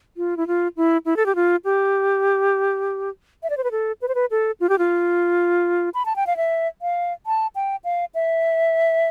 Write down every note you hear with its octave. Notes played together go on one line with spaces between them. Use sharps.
F4
E4
F4
E4
E4
A4
G4
F4
G4
E5
D5
C5
B4
A4
B4
C5
B4
A4
F4
G4
F4
B5
A5
G5
F5
E5
F5
A5
G5
F5
E5